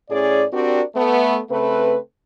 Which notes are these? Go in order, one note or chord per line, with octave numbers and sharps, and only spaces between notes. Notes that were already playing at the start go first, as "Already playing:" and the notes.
A2 C#4 G#4 D5
C4 D4 F#4 G4 A#4 D5
A3 B3
C#3 A3 C4 B4